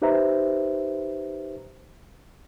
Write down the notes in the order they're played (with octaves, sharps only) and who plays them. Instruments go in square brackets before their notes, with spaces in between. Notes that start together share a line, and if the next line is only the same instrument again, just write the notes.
[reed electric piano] D#4 G4 B4 C5 E5 A#5